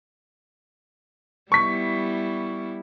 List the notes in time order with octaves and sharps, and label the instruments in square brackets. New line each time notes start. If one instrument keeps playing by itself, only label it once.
[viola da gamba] G3 B3 E4 [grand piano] C#6 B6